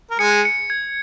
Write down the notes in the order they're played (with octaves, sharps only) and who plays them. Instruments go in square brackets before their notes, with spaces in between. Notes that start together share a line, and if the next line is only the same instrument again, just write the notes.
[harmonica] A#4
[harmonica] G#3 G#4 [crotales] C#7
[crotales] C#7
G#6